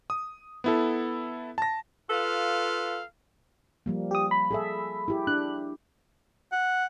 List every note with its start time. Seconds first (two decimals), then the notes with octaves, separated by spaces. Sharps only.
0.10 D#6
0.64 B3 E4 A4
1.58 A5 A#6
2.10 F4 A4 B4 F5
3.86 F3 G3 A#3
4.11 G4 D#6
4.31 B5
4.51 G#4 A4 E5
5.08 E4 G4
5.27 D4 F#6
6.52 F#5